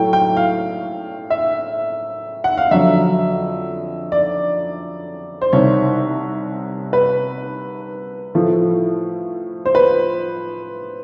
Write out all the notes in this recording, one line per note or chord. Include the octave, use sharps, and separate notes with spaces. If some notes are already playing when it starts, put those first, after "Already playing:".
Already playing: A2 F#3 A3 G5
G5
F5
E5
F#5
F5
F2 D3 F#3 E5
D5
C5
C2 C3 D#3 C#5
B4
A2 F3 A3
C5
B4